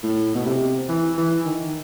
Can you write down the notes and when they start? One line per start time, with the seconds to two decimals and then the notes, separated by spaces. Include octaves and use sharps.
0.03 A2
0.35 B2
0.46 C3
0.89 E3
1.17 E3
1.46 D#3